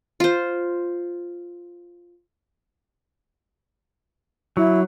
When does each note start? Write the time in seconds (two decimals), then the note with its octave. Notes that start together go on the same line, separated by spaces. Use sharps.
0.20 F4 C5
4.57 F#3 E4